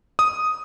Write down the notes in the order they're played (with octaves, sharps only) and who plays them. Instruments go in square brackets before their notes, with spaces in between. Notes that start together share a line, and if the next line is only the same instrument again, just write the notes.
[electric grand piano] D#6